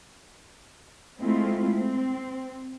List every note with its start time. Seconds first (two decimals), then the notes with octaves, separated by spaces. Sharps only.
1.21 G#3 A3 C4 E4 F4
1.74 C4